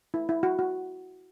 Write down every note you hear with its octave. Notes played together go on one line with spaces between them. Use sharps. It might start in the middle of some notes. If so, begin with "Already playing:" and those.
E4
E4
F#4
F#4